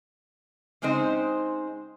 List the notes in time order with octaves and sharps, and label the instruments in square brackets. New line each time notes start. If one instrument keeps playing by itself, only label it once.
[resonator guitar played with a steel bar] C#3 G#3 C4 D#4 C5